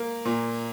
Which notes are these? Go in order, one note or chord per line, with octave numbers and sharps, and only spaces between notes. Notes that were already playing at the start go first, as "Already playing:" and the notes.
Already playing: A#3
A#2